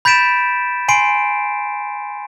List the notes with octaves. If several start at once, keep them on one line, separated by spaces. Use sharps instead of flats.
B5 G6 A6 B6 D7 E7
G#5 B5 C6 C7 D7